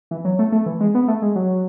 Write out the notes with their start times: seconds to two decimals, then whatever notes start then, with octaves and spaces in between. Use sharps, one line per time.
0.11 E3
0.25 F#3
0.39 A3
0.52 A3
0.66 E3
0.80 G#3
0.95 B3
1.08 A3
1.22 G#3
1.36 F#3